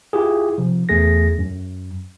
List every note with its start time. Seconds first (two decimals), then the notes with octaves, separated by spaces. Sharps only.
0.13 E4 F4 G4 G#4
0.58 C3 F3
0.89 E2 A3 G#4 A#6
1.39 F#2